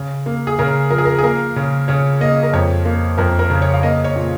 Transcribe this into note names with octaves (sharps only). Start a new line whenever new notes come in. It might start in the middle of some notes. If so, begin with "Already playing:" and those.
Already playing: C#3
A#3
G#4
C#3 A#4
F3 A#4
G#4
A#4
G#4
A#3 A#4
C#3
C#3 C#5
A#3 D#5
A#4
F2 C#5
A#3
F2 A#4
A#4
C#3
C#5
F5
A#3 D#5
C#5
A#2